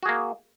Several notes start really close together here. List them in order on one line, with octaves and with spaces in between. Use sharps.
F#4 G#4 A#3